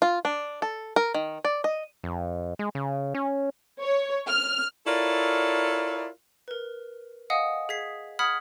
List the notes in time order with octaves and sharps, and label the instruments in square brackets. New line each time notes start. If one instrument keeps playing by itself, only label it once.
[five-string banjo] F4
D4
A4
A#4
D#3
D5
D#5
[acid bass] F2
G#3
C#3
C#4
[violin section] C#5
F6
[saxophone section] E4 F4 A4 A#4 C#5 D5
[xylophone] A#4 B4
D#5 F5 F#5 G#5 D#6
G#4 G#6 B6 C7
F#5 B5 D#6 F6 G#6 B6